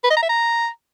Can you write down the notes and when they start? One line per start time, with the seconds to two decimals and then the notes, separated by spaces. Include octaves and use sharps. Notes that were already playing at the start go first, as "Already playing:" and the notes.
0.04 B4
0.10 D#5
0.16 A#5
0.22 E5
0.29 A#5